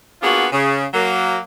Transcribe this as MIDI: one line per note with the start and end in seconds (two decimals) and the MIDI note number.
0.22 0.47 58
0.22 0.47 59
0.22 0.47 62
0.22 0.47 65
0.22 0.47 66
0.22 0.47 68
0.52 0.85 49
0.94 1.40 54
0.94 1.40 58